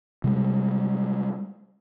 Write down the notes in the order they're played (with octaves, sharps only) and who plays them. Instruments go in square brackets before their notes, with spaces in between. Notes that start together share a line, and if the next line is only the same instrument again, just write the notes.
[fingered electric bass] C3 G3 G#3